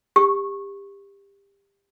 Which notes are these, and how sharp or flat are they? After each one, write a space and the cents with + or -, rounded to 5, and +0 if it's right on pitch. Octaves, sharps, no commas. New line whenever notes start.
G4 +25 C#6 -15